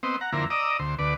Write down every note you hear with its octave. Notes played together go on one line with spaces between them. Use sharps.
B3 C4 C5 D#5
F#5 A#5
F2 D3 A#3 E4 C5 A#5
D5 D#5 A#5 D#6 E6
D2 C5
D2 B4 D5